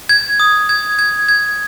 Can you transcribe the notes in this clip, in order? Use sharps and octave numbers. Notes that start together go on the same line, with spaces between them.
G#6
D#6
G#6
G#6
G#6